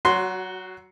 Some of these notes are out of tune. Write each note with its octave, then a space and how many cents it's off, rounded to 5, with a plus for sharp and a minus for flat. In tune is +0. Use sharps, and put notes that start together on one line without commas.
F#3 +25 F#4 -5 C6 +0